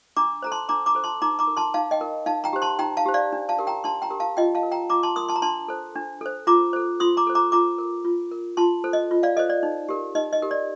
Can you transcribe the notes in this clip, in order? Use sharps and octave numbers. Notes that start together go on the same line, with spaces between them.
D4 A#5 D6
A4 C5 A#5
A5 C6
D4 A#5 D6
A#5 D6
A4 C5
A5 C6
D#4 A#5 D6
A#5 D6
A#4
A5 C6
D#4 F5 A5
D#5 G5
A#4
D#4 F5 A5
G5 A#5
G4 C5
A5 C6
D#4 G5 A#5
F5 A5
G4 C5
D5 F5
D4
F5 A5
G4 A#4
G5 A#5
D4 A5 C6
G5 A#5
G4 A#4
F5 A5
F4 D#5 G5
F5 A5
A#4
G5 A#5
F4 A#5 D6
A5 C6
A#4 C6 D#6
A5 C6
A#5
D4 A5 C6
A4 C5
D4
A4 C5
F4 A#5 D6
A4 C5
F4 C6 D#6
A#5 D6
A4 C5
A#5 D6
F4 A#5 D6
A#4
F4
A#4
F4 A5 C6
A4 C5
D#5
F4
D5 F5
A4 C5 D#5
D5
D#4
G4 A#4
D#4 D#5
D#5
G4 A#4
D5